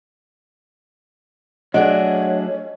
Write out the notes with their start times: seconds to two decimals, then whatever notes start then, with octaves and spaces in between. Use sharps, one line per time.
1.74 F#3 A3 D4 F#4 G#4 C#5 D#5